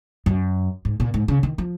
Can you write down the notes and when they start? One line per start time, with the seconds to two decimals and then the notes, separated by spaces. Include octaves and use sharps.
0.26 F#2
0.85 G#2
1.00 A#2
1.14 G#2
1.28 C#3
1.43 D#3
1.58 F3